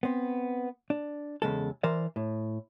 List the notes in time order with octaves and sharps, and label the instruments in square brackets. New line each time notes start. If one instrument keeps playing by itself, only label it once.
[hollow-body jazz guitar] B3 C4
D4
E2 C#3 G#3 A4
E3 A#4 C5 D5
A2